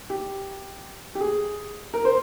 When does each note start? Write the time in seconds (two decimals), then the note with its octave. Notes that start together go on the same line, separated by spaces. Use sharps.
0.10 G4
1.15 G4
1.20 G#4
1.94 A#4
2.05 C5